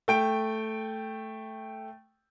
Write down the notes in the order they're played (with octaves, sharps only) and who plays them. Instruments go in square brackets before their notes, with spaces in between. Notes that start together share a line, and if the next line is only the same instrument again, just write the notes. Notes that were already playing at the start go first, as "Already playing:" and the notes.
[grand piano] A3 G5 D7